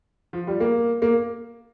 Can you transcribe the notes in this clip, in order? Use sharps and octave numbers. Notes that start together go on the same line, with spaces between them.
F3
G3
A#3
A#3